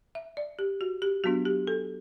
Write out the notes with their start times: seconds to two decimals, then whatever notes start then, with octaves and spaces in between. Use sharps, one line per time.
0.15 E5
0.37 D5
0.59 G4
0.81 F#4
1.02 G4
1.24 F#3 B3 D4 F#4
1.45 G4
1.67 A4